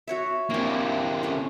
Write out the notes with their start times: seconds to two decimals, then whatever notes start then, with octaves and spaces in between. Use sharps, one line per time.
0.08 F#4 C#5 E5
0.50 C3 A#3 C4 E4
1.23 A3 C#4